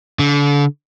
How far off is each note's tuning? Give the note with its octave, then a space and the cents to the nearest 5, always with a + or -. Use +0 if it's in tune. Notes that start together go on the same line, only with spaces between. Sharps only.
D3 -35